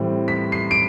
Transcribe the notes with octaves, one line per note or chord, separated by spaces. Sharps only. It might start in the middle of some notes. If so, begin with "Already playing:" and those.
Already playing: A2 E3 G3 C4
B6
C7
D7